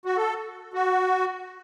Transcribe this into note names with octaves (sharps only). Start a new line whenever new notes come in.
F#4
A4
F#4